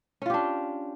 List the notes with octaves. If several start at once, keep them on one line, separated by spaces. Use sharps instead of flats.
C#4 D4 F4 G4